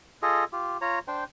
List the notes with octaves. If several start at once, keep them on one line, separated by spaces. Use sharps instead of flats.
F4 G#4 A4 D#5
F4 G4
F4 C#5 A#5
D4 C5 G5